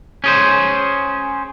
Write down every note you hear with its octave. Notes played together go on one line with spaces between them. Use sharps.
C#4 G#4 C5